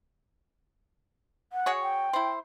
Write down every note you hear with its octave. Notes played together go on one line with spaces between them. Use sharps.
F#5
F#4 G#4 C#5
G5
E4 C5